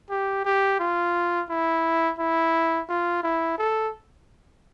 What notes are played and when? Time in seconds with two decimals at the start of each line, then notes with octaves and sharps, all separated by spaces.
0.10 G4
0.45 G4
0.80 F4
1.50 E4
2.19 E4
2.89 F4
3.23 E4
3.58 A4